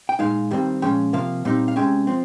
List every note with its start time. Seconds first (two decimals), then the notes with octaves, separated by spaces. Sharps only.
0.09 G5
0.19 A#2 G#3 D#4 F5
0.51 G2 D#3 G3 C4
0.82 A#2 F3 G#3 C#4 G5
1.13 C3 F3 A#3 F5
1.45 A#2 G3 C4 D#4
1.68 F5
1.76 C3 F3 G#3 C#4 G5
2.07 F3 C4